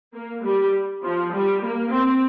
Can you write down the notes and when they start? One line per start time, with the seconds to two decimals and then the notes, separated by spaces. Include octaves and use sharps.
0.14 A#3
0.44 G3
1.03 F3
1.32 G3
1.62 A#3
1.91 C4